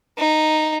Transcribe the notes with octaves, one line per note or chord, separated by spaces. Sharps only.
D#4